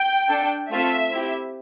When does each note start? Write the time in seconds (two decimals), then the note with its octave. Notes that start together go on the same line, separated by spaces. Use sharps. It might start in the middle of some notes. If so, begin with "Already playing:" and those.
Already playing: G5
0.28 D4 A4
0.69 A3 C4 F4 A4 E5
1.11 C4 E4 G4